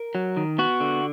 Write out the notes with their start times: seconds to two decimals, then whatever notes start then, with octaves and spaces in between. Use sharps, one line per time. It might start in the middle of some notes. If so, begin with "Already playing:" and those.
Already playing: A#4
0.15 F#3
0.37 D#3
0.58 B3 F#4
0.80 D3